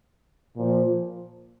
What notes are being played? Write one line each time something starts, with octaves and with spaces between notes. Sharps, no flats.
A#2 F3